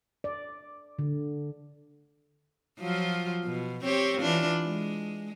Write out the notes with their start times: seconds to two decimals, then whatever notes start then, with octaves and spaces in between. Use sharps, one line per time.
0.24 D5
0.99 D3
2.80 F3 F#3 F4
3.44 B2
3.83 C4 G4 C#5
4.20 E3 D4 F4
4.66 G#3